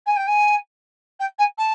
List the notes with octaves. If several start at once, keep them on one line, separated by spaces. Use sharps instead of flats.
G#5
G5
G#5
G5
G#5
A5